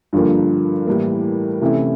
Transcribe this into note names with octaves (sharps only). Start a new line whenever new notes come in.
G2 D3 F3 A#3
A2 E3 G3 A#3
C3 E3 A3 C#4 E4